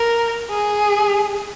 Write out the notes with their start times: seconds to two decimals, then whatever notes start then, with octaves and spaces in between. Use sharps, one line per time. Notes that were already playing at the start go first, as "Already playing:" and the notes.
Already playing: A#4
0.50 G#4